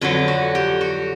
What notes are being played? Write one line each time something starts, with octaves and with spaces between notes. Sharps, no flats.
F2 D3 F#3 B4
F#4
G4
F#4